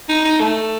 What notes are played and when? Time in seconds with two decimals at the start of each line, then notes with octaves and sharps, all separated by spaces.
0.09 D#4
0.24 D#4
0.40 A3